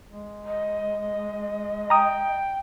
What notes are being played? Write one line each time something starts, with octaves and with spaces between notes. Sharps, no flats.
G#3
D#5
G5 A#5 D#6